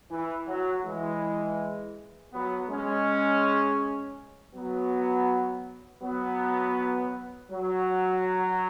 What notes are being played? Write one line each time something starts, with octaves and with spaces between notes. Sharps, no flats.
E3
F#3
E3 G#3
F#3 B3
G#3 C#4
F#3 B3
F#3 B3
F#3